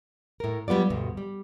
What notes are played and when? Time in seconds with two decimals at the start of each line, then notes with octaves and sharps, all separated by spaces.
0.40 A2 A#4
0.68 F#3 G3 B3 F4 D5
0.90 D2 G2 B2
1.17 G3